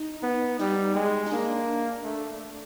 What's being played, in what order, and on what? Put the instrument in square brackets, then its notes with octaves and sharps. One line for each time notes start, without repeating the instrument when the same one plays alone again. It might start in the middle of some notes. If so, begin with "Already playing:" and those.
Already playing: [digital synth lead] D#4
[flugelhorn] B3
[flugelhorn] G3 [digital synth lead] D#4
[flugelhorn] G#3
[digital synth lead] D#4
[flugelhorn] A#3 [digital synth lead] D4
[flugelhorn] A3